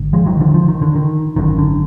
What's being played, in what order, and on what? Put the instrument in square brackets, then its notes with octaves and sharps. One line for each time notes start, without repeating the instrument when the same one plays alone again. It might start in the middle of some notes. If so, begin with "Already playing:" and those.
Already playing: [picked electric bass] G#1 D3
F3 G#3
D#3 F#3
D3 F3
F3
D#3
D3
D#3
G#1 F#2 D3 D#3
D3